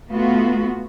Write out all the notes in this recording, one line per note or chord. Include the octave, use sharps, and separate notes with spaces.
A3 B3 F4 F#4